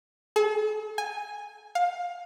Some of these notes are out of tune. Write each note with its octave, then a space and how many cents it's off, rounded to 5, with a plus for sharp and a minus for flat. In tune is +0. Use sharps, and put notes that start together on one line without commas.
A4 -45
G#5 -10
F5 +20